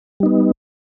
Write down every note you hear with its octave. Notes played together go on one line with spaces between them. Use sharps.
G3 B3 D#4